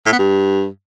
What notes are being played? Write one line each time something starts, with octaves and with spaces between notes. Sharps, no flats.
A2
B3
G2